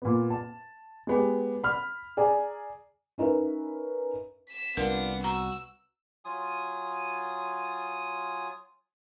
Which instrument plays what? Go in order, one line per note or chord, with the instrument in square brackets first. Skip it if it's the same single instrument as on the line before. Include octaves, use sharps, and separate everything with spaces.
[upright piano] A#2 B3
A5
G#3 B3 G4
B5 F6
G#4 D5 G#5 A#5
[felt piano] C#4 D#4 A#4 B4 E5
[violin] B6 E7
[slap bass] C2 [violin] B3 F#5 [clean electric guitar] D4 F4 [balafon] A#4
[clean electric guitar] F#4 [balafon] A#5 [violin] E6
[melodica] F#3 F4 G#5 D#6